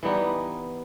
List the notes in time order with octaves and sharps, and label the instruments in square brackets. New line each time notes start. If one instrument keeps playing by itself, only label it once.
[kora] E3 G3 B3 D#4